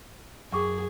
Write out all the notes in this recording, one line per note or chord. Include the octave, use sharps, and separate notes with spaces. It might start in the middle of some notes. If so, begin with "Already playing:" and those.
F#2 G#4 G5 C#6 D6